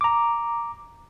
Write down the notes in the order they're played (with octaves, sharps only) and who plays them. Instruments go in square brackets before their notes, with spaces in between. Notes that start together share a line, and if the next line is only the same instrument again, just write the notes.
[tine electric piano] A#5 D6